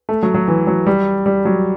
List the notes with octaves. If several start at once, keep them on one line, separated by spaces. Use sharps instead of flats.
A3
F#3
F#3
E3
F#3
G3
G3
F#3